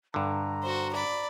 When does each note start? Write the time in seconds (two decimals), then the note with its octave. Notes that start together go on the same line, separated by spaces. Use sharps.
0.14 G2 D3 A#5
0.63 F#4 C5
0.93 D5 B5